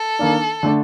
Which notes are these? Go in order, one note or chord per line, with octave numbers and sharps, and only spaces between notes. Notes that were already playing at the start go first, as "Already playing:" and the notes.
Already playing: A4
D#3 A#3 D4
D3 A3 D4